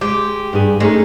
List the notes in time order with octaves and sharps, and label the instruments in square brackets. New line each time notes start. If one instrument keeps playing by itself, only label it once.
[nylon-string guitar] G#3 [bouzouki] G4
[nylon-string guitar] G2 G#4
[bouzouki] G#3 [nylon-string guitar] A3 C#4 D#4